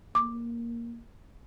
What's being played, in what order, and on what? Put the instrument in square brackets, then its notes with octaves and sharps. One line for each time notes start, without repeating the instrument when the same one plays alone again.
[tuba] A#3 [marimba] D6